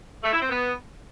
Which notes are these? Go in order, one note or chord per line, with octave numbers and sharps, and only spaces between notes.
A3
E4
C4
B3